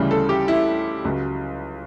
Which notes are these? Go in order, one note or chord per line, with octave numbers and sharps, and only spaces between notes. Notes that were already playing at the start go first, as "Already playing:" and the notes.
Already playing: D2 C#3 E3 G3
A4
G4
E4
C#2 C#3 F#3